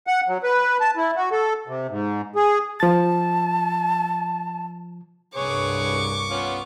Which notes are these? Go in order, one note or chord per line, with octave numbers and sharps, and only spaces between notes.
F#5
F#3
B4
A5
E4
F#4
A4
C3
G#2
G#4
F3 A5 A6
C2 G2 G#4 B4 C#5 C#6 D6
B3 C#4 F4